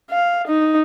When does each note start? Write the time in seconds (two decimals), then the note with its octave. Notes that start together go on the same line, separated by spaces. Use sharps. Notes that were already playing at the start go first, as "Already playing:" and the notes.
0.11 F5
0.47 D#4